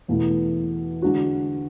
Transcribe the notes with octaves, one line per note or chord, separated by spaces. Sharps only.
E2 B2 A3 E4
D3 G#3 D4 F#4